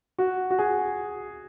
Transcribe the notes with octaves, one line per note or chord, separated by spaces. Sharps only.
F#4
F#4
G#4